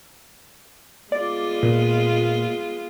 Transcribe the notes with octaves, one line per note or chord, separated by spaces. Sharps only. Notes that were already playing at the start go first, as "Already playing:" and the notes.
G#3 B3 F4 D5
A#2